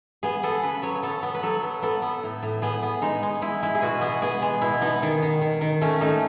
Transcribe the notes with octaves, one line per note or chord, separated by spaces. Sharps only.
B3 G#4
B3 A4
C#3 B4
F#3 C#5
B3 A4
B3
B4
F#3 A4
B3
B3 A4
B3
A2
A2
B3 G#4
B3
G#3 D#4
G#3
G#3 E4
G#3 E4
G#4
B2 F#4
B3 G#4
B3 G#4
G#3
B2 E4
B3 D#4
D#3
D#3
D#3
D#3
A3 C#4
A3 D#4